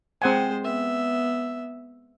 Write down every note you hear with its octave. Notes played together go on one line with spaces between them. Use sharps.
G#3 C4 C5 F#5 G#5
B3 E5